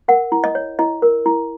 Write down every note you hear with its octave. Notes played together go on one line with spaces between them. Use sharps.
A#4 F#5
E4
D#5
C#5
E4 D#5
A#4
E4